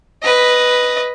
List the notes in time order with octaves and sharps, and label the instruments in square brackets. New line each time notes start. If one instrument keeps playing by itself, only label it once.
[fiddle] B4 D#5